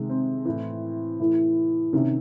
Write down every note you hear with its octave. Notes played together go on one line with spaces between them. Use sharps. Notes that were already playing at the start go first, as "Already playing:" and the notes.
Already playing: C3 D#3 G#3
C4
A2 E3
A2 E3
C3 D#3 C#4